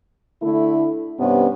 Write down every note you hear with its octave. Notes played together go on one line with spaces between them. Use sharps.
D3 A3 E4
G2 C3 B3 C#4